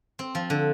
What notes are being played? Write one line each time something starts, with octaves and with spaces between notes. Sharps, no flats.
C4
F3
D3